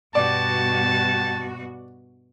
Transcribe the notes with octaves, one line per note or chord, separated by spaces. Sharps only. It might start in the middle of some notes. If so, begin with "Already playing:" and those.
G2 B2 F#4 G4 D5 A5